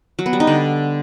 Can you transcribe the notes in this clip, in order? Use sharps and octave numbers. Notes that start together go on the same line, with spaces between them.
F#3
B3
G3
D#4
D3